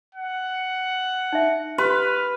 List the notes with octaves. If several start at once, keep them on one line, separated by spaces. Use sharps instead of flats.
F#5
D#4 E5
G4 B4 C6 F6